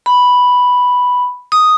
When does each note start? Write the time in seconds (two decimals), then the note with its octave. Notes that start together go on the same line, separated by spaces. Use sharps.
0.06 B5
1.52 D#6